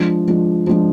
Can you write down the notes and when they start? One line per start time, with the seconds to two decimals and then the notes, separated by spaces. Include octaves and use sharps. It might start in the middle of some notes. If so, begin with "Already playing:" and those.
Already playing: F3 G#3 D4
0.28 F3 G#3 D4
0.67 F3 G#3 D4